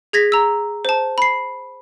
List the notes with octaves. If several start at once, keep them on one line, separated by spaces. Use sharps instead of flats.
G#4 G#6 A#6 B6
A#5 E6
C5 A5
B5 C7